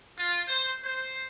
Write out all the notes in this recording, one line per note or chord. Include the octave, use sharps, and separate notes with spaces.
F4
C5
C5